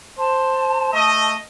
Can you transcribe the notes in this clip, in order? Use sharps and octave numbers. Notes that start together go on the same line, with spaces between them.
C5 A5
A3 D#5